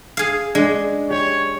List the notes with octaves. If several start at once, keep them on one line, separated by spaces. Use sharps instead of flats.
G#4 F5
G#3 D4
G4 C#5